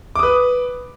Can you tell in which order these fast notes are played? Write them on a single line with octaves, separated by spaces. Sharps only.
D6 D#6 B4